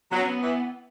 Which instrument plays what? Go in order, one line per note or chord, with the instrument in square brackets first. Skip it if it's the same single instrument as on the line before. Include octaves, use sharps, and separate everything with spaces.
[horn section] F#3 [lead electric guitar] B3
[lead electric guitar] C#4
B3
[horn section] E3